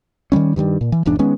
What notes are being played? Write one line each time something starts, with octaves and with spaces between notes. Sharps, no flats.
D#3 E3 G3 C#4
G2 D#3 F#3 G3
A#2
E3
E1 E2 G#2 D4
D#3 G#3 B3 C#4